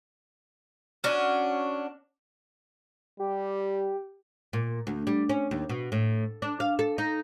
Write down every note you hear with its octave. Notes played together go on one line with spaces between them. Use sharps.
C#4 D4 F#4
G3 G4
A#2
D2
G3
C#4
D#2
B2
A2
D4
F5
A4
D#4